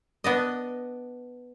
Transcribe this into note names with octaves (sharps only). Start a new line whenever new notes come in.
B3 D4 D#5